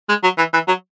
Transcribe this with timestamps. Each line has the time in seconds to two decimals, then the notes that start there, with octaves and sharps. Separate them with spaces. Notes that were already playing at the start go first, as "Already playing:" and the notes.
0.09 G#3
0.23 F#3
0.38 E3
0.53 E3
0.68 F#3